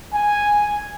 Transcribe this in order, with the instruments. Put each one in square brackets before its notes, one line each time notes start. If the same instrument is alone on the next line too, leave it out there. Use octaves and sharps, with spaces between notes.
[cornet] G#5